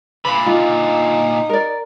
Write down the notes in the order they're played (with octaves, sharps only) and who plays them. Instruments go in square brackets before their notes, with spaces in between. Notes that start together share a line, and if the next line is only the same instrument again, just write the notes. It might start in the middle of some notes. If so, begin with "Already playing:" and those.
[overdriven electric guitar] A#2 D3 [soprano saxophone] B5
[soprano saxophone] D#4 [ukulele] F4
[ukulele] A#4 D5